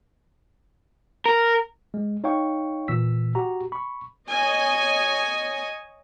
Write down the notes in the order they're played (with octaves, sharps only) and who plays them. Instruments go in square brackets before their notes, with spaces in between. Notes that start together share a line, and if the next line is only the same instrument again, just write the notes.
[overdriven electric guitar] A#4
[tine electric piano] G#3
D#4 C#5 F5 G5 C#6
A#2 E3 E6 B6
F#4 G4 A#5
B5 C#6
[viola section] C#5 D#5 G#5